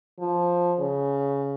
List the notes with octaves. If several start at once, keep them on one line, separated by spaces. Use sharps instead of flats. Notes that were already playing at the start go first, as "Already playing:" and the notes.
F3
C#3